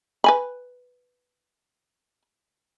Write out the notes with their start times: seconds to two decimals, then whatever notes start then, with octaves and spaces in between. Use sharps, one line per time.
0.24 B4 G#5 B5